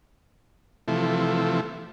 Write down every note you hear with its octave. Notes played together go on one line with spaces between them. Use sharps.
C3 E3 F3 A3